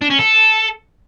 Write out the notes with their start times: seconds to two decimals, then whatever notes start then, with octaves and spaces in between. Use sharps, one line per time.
0.02 D4
0.10 C#4
0.19 A4